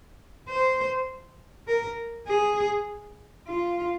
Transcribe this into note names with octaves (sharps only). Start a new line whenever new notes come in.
C5
A#4
G#4
F4